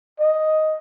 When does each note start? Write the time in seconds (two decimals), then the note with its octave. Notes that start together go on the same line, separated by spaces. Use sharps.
0.20 D#5